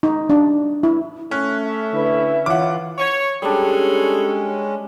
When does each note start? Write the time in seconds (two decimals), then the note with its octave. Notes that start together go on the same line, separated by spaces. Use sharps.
0.03 D#4
0.30 D4
0.83 E4
1.31 A3 C#4 F#6
1.64 E5
1.92 D3 E4 B4
2.46 E3 F4 C#5 F#5 D6
2.98 C#5
3.42 G3 G#3 C#4 D4 G#4 A4 C#5